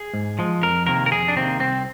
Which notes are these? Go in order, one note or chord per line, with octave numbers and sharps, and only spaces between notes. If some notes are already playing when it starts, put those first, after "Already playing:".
Already playing: G#4
G#2
F3 G#3
F2 A#4
C3 D#3 A#3 A#4
A#4
F2 G#4
D4
C3 D#3 A#3 C4
C2 C4